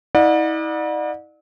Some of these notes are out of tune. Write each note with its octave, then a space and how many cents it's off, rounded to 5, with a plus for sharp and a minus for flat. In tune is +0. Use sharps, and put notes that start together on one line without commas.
E4 -45 D5 +30 F#5 -35